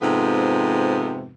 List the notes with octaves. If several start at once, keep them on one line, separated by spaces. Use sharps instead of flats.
F2 G#2 C3 B3